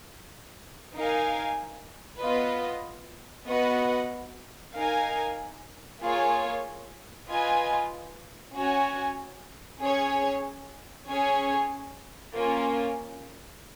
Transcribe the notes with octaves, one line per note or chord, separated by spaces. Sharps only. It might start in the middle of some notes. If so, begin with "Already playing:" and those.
D#4 A#4 F5 G#5
B3 F4 B4 D#5
B3 F#4 B4 D#5 F#5
D#4 A#4 F5 G#5
A#3 F4 G#4 C#5 G#5
F4 B4 D#5 G#5
C#4 F#4 C#5 G#5
C#4 G#4 C#5
C#4 G#4 C#5 G#5
A#3 C#4 F4